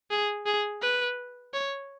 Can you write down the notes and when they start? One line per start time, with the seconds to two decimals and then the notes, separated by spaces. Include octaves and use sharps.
0.11 G#4
0.46 G#4
0.82 B4
1.54 C#5